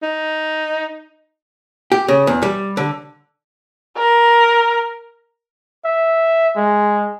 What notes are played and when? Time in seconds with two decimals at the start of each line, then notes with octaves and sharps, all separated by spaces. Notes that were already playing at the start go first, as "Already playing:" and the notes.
0.02 D#4
1.92 G4
2.08 C#3
2.27 E2
2.42 G3
2.77 D3
3.97 A#4
5.85 E5
6.56 G#3